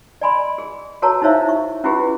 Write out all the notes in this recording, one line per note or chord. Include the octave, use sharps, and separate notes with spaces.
D5 D#5 G#5 B5 C6
G#4
F#4 A4 A#4 C#5 A5 A#5
D#4 E4 C5 C#5 E5 F5
C#6
C#4 E4 F4 G4 G#4 B4